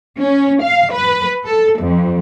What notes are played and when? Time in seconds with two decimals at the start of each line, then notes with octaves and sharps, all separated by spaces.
0.18 C#4
0.62 F5
0.93 B4
1.45 A4
1.79 F2